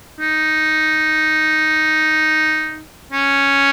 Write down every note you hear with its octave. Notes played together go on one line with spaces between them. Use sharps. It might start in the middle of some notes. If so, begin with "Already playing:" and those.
D#4
C#4